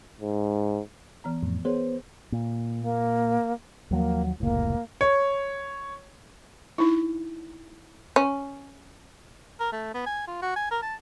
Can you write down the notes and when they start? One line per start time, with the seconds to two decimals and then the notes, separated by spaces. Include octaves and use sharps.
0.21 G#2
1.24 E3 B3 A#5
1.43 F2 A2
1.65 B3 G#4 A#4 C5 C#5
2.32 A#2
2.81 A#3
3.91 D#2 F3 F#3 A#3
4.40 F1 C#2 A2 A#3
5.01 C#5
6.78 D#4 E4
8.16 C#4
9.60 A#4
9.72 A3
9.94 B3
10.06 G#5
10.27 F4
10.42 F#4
10.56 G#5
10.71 A#4
10.82 A5